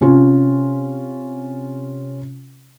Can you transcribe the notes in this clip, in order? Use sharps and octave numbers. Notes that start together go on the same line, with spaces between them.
C3 C#4 F4